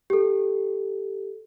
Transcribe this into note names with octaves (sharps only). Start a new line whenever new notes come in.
G4 A4